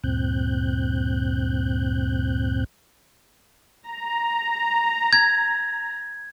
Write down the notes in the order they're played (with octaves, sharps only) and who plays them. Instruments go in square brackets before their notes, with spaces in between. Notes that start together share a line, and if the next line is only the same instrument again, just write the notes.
[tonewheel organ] D2 G2 A#2 C4 F#6 G6
[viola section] A#5
[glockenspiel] G#6